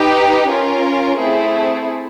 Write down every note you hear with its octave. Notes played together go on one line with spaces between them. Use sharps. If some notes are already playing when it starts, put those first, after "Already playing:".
Already playing: D#4 G4 B4
C#4 F4 A#4
A3 C4 E4 G#4